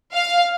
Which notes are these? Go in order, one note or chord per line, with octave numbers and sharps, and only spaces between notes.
F5